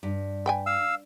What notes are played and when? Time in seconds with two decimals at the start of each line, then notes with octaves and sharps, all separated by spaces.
0.03 G2
0.46 B4 G5 G#5
0.66 F5 E6